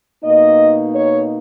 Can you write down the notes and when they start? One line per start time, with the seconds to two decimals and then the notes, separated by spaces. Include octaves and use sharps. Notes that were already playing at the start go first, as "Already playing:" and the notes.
0.23 B2 A#3 D#4 D#5
0.94 C#5